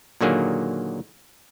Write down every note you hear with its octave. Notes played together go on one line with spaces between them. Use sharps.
A#2 D3 D#3 F#3 A#3 G#4